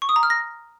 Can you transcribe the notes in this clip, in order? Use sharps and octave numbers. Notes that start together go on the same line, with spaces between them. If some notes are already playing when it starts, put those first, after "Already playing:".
C#6
D#6
A#5
F6
A#6